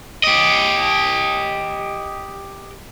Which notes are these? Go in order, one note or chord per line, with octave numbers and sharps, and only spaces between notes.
G4 D#5